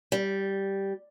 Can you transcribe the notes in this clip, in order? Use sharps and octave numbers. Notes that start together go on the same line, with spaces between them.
G3